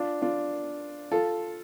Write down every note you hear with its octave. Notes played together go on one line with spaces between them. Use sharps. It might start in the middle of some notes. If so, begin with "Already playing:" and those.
Already playing: D4 F4
D4 F4
F4 A4